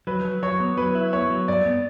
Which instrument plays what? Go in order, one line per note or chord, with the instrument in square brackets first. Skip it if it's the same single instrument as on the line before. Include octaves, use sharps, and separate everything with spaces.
[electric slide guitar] F#3 [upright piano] B4
[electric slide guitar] F#3
[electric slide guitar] F#3 [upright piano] C#5
[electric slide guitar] B3
[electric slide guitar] F#3 [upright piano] B4
[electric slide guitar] E4
[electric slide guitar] B3 [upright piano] C#5
[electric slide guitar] F#3
[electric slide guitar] G2 [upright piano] D5
[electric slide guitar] B3